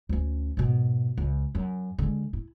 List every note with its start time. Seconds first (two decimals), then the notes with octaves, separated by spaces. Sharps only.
0.09 D2 C#4
0.57 G#2 B2
1.18 C#2
1.55 F#2
1.99 D3 G#3
2.33 E4